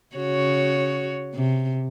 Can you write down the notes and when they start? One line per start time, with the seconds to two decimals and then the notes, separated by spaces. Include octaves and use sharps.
0.16 C#3 F#4 C#5
1.34 C3